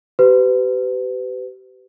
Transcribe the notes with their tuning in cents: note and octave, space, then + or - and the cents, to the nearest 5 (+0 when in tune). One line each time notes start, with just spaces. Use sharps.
G4 -30 B4 +35